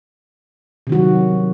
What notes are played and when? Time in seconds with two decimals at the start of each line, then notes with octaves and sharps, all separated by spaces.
0.87 C3
0.90 D#3
0.92 F#4
0.95 F#3